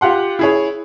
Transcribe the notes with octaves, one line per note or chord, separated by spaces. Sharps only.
F4 G4 F#5 C6
E4 G#4 C#5